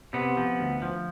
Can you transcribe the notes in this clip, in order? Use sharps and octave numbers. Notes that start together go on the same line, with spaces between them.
C3 B3
F3
D2
F3